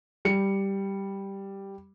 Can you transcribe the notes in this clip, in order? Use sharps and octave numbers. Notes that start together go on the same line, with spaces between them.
G3 C#7